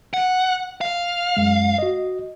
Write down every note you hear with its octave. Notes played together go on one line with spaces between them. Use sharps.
F#5
F5
F#2 G#3
F#4 D#5